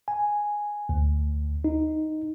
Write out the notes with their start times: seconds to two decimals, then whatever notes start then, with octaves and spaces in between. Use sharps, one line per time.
0.08 G#5
0.89 D2
1.64 D#4